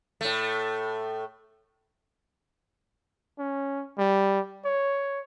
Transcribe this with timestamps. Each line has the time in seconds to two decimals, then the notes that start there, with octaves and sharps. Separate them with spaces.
0.21 A2 A3
3.39 C#4
3.98 G3
4.65 C#5